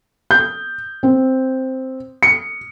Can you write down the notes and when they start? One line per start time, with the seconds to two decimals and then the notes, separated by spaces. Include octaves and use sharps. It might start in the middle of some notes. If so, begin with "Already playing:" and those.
0.31 G6
1.03 C4
2.23 C#7